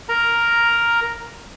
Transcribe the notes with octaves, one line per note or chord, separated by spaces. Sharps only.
A#4 A#5